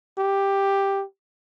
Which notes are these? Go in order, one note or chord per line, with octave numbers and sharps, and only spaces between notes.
G4